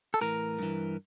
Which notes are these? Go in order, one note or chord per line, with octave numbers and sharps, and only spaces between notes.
A4
A2 E3 A#4
G2 E3